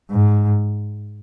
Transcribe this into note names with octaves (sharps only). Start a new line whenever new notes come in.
G#2